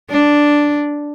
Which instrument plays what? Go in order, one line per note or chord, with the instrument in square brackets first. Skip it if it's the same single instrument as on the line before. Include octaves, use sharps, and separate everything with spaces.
[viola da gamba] D4